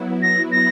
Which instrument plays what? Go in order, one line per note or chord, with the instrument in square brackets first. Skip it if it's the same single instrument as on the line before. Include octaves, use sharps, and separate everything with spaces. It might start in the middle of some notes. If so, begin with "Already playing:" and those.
Already playing: [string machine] F#3 B3 E4
[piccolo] A#6
A#6